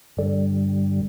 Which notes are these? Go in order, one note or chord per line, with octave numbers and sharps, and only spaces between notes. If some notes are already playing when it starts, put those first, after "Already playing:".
G2 D3 G3